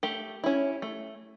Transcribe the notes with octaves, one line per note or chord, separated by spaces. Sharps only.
A3 G4
C#4 E4
A3